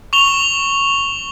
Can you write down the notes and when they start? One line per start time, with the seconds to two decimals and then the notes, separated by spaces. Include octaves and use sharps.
0.13 C#6 F7 G7